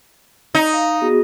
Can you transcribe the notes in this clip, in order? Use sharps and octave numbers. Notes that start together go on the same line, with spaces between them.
D#4
F5
B3 F#4 G#4